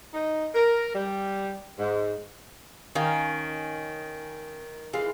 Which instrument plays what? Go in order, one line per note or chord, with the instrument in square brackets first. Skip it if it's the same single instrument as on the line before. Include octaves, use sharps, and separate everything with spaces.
[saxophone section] D#4
A#4
G3
G#2
[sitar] D#3 [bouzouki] C#4 D#4 F5
[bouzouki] E3 G#3 F4